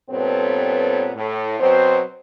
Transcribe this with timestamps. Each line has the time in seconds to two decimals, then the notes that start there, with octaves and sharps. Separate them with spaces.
0.10 G2 A#2 B3 C4 A4 C#5
1.16 A2
1.60 B2 F#3 C4 C5